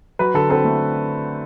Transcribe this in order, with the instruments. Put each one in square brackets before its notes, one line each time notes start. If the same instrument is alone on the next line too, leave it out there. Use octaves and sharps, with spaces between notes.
[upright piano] F#3 B4
D3 A4
C4 A4
A3